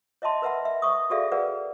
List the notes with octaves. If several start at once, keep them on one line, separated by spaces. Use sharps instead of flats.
C#5 D#5 E5 A5 C6
A#4 B4 E5 F#5 B5
E5
C#5 E5 C#6 D#6
F#4 G#4 A4 D5 E5 F5
G#4 A#4 B4 D5 F#5